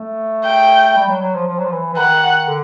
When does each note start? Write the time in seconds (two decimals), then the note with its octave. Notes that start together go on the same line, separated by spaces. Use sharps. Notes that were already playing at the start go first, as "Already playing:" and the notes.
Already playing: A3
0.45 G5
0.97 G3
1.08 F#3
1.21 F#3
1.35 F3
1.47 F3
1.59 F#3
1.65 F3
1.72 E3
1.93 E3
1.98 D#3 F#5
2.48 D3